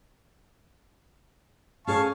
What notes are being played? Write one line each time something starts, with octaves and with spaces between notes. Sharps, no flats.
C#4 G#4 C#5 F5 A5 C#6